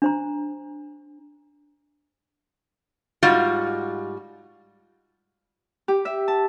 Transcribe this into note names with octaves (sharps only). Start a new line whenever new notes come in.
D4 C5 A#5
G#2 G3 F4 F#4
G4
E5
A5